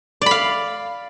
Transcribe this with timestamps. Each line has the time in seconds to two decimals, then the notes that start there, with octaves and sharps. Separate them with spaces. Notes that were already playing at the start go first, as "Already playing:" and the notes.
0.21 D5
0.26 B5
0.31 F5